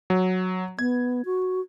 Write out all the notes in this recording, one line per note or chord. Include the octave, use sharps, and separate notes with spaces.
F#3
B3 G#6
F#4